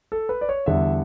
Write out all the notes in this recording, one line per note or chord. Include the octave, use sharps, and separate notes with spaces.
A4
B4
D5
C#5
E2 D3 G3 E5